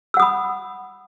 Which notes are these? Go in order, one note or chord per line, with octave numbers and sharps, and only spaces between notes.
F#5 B5 D#6 E6